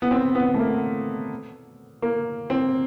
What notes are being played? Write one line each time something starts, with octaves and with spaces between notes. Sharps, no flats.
B3
C4
B3
A3
A#3
A#3
C4